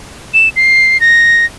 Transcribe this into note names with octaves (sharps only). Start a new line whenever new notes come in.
E7
C7
A#6